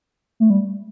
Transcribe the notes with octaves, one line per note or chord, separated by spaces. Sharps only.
A3
G3